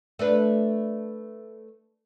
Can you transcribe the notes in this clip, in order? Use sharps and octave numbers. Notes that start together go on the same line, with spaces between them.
A3 D4 B4